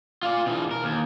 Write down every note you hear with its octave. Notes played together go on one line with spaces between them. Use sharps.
F4 D5
B2 E3
A#4
D#2